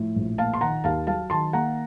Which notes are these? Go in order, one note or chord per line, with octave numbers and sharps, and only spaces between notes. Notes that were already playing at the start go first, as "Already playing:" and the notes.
Already playing: A2 F3
A#1
A#3 F5 A5
C6
D#3 F#5 A#5
D#2 F5 A5
F#3 F5 A5
D#3 A5 C6
A#3 F#5 A#5